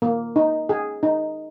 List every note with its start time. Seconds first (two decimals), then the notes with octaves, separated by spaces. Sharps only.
0.02 A#3
0.36 D#4
0.69 G#4
1.03 D#4